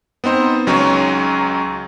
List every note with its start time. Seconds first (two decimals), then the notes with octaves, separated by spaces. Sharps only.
0.24 B3 C4 D#4 C5
0.67 C#2 F#3 C#4 D#4 F#4 C#5